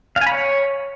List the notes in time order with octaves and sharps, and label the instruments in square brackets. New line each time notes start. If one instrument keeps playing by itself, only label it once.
[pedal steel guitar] F5
G#5
B5
C#5